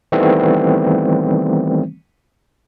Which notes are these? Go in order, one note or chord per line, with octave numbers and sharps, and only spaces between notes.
D#3 E3 G3 A3 B3 C4